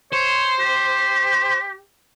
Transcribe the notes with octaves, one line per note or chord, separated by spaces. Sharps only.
C5 C#5
G4